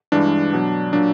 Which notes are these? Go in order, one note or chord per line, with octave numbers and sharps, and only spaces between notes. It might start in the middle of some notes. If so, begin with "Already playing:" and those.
G2 E3 G#3 D4
B2 F#3
A#2 F#3 D4